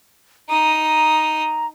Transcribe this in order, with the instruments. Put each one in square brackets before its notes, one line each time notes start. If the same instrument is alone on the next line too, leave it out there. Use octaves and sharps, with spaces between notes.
[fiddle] D#4 D#6 [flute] A#5